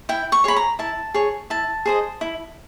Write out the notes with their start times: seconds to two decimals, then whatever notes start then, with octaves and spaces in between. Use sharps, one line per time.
0.09 E4 G5
0.32 C#6
0.44 G#4 C#5 B5
0.56 A#5
0.79 E4 A5
1.14 G#4 C#5
1.50 E4 A5
1.86 G#4 C5 D#5
2.21 E4